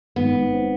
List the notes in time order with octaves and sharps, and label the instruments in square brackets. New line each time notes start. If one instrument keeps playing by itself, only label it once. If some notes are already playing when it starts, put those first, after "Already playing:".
[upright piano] G#1 [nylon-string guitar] B3
[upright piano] G#2
C4